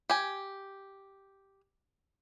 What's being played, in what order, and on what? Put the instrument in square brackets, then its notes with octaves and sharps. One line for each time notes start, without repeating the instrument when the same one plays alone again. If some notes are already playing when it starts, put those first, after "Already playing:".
[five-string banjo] G4 G#5